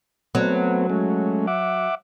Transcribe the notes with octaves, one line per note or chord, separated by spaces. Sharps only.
F#3 A3 B3 C4
G#3 A3 C#4
E5 F#5 D6